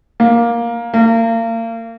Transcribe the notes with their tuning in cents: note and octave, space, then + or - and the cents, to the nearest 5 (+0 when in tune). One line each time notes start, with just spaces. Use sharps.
A#3 +10
A#3 -35